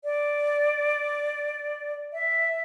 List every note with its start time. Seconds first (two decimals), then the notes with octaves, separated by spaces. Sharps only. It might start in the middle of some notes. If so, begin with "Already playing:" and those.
0.04 D5
2.13 E5